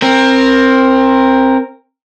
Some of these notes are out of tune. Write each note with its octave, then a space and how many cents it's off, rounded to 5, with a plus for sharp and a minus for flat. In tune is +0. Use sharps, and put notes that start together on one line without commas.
C4 +15 A#4 +0